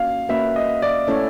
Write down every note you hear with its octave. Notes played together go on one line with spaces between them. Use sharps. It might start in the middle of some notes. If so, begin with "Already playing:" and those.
Already playing: A#3 C#4 F#4 F5
A#3 C#4 F#4 B4 E5
D#5
D5
A3 C#4 E4 A4 C#5